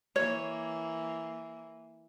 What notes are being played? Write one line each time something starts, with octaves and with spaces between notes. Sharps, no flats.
E3 A#3 C#5